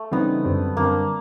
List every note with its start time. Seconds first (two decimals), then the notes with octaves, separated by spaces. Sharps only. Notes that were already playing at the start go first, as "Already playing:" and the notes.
Already playing: A3
0.12 C#3 E3 G3 B3 C4 D#4
0.44 F#2 D3 G3 C4
0.76 F#2 D3 G3 A#3 C4